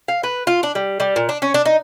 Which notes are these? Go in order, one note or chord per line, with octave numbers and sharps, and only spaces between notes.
F5
B4
F4
D4
G3
G3
A#2
D4
C#4
D4
D#4